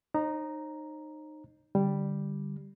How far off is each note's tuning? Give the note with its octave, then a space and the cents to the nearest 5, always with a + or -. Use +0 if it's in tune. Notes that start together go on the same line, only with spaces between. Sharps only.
D#4 -25 C5 +45 A#5 +0
D3 +0 G3 +0